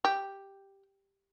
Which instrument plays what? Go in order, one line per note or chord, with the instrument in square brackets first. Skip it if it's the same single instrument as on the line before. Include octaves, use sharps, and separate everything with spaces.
[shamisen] G4